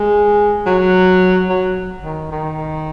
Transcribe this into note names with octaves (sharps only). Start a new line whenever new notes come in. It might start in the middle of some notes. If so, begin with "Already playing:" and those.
Already playing: G#3
F#3
F#3
D#3
D#3